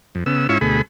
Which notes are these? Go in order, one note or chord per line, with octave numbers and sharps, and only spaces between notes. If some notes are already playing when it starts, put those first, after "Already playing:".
F2
C#3 B3 E6
G#2 C#4 E4 F4 C#6 E6
D2 B2 A3 G#4 B5